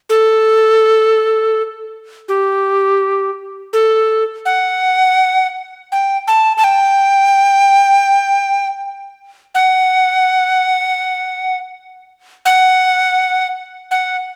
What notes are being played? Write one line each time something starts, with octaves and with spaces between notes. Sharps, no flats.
A4
G4
A4
F#5
G5
A5
A5
G5
F#5
F#5
F#5